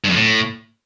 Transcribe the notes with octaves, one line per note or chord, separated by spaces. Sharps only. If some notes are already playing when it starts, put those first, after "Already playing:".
G2
F2
A2